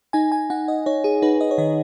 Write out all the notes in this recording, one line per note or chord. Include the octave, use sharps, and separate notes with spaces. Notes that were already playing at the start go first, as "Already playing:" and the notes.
D#4 G#5
G#5
D#4 F#5
D#5
D#4 C#5
G#4
D#4 B4
D#5
C#5
D#3 D#5